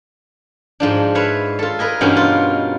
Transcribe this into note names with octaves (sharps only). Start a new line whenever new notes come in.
G#2 F3 D4
B4 C#5 E5 F5
F4 A4
A#4 B4 D#5 G#5
G2 B2 E3 A#3 C#4 D#4
F4